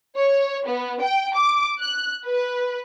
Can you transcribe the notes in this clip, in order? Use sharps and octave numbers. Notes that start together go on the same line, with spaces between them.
C#5
B3
G5
D6
F#6
B4